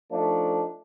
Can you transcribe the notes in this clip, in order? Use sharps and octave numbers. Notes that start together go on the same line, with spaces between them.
F3 A3 D4 D#4